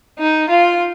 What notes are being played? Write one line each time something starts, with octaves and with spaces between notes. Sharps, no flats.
D#4
F4